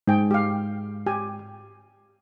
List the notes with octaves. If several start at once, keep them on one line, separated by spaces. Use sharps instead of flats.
G#2 G#4 G5
G4 F5
G4 G#5